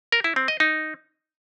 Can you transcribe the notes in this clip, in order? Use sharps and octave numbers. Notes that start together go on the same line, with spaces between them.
A#4
E4
C4
D#5
D#4